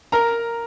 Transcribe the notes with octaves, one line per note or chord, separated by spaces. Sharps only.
A#4 A#5